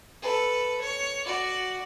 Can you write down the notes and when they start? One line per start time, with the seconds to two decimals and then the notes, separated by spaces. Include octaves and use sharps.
0.22 A4 B4
0.81 C#5
1.26 F#4 D5